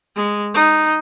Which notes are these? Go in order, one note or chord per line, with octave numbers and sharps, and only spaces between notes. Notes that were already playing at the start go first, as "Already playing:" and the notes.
G#3
D#4